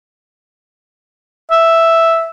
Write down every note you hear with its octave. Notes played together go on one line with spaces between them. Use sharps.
E5